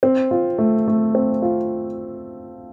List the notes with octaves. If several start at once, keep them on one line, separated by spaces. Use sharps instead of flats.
C4
F4
A3
A3
C4
F4